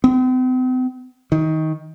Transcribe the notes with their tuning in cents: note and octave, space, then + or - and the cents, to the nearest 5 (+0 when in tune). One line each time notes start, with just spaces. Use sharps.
C4 -45
D#3 +20